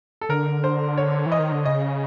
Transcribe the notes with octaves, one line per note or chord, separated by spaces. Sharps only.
A4
D3 A#4
C5
C#5
E3
D#5
D#3
D3
C#3 D#5